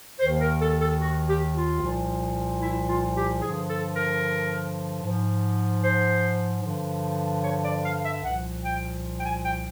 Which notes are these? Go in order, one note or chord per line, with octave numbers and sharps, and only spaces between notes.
D#2 D#3 C5
A#4
A4
A4
F#4
G4
F4
C2 A#2 F3
E4
F4
G4
G2 D3 F3 G#4
A4
A#4
G#2 F3
C5
G2 D3 F3
C#5
D5
F5
E5
C2 A#2 F3 F#5
G5
G5
G#5
G5